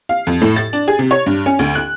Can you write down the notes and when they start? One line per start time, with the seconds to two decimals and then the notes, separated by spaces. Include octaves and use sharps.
0.09 F5
0.27 F2
0.42 A2
0.56 A6
0.73 D4
0.88 G#4
0.99 C3
1.11 C#5
1.26 G2
1.46 C#4
1.59 D2
1.75 F#6